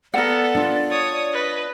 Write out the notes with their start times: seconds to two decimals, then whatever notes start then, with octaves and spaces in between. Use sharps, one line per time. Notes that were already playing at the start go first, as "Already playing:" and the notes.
0.14 B3 A4 A#4 D5 F#5
0.55 D4 F4
0.91 C#5 D#6
1.33 B4 D#5